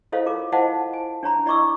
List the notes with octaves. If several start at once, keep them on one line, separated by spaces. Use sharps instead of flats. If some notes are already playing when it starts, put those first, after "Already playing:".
E4 A4 C5 C#5 D#5 F5
F4 A#4 D6
E4 C5 D#5 F5 F#5 A5
G#5
D4 C#5 A#5 B5
E4 D5 D#5 C#6 D6 E6